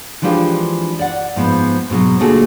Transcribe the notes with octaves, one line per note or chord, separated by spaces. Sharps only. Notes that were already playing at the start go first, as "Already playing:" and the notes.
E3 F3 G#3 D4 F4 G4
D5 F#5
G#2 F3 B3
G#2 B2 D3 F#3
D2 A#2 A3 F#4 G#4 A4